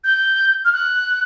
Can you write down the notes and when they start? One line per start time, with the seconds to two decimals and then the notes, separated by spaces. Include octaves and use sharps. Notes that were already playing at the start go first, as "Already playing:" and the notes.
0.04 G6
0.65 F6
0.73 F#6